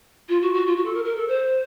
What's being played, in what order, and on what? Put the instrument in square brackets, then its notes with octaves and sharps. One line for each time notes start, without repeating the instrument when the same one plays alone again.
[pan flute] F4
F#4
F#4
F4
F#4
A4
A#4
A#4
A4
C5